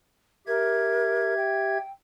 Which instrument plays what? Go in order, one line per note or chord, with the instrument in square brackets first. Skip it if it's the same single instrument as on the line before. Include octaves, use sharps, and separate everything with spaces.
[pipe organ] G4 E5 G#6 [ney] A#4
[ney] G5